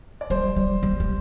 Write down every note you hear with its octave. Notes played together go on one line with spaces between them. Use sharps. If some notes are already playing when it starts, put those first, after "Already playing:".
D5
G3 C5
G3
G3
G3